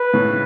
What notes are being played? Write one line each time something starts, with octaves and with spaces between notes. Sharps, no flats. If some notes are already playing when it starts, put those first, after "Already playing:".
Already playing: B4
A2 C#3